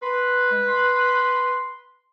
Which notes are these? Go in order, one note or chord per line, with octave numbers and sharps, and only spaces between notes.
B4 C6
G#3
C6